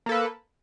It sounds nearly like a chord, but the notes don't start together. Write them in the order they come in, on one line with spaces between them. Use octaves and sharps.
A#3 A4 B4